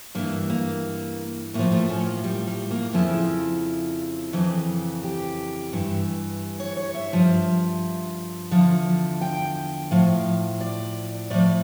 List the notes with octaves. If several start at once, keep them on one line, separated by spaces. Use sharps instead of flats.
G2 E3 A#3
A#3
A2 F3 A#3
A3
C#4
A#3
G3
G3
A#3
F2 C#3 F3 E4
F2 C#3 E3
G4
G2 E3
C#5
C#5
E5
G2 F3
E2 D3 F3
G5
A2 F3 F5
D5
A2 F3 D5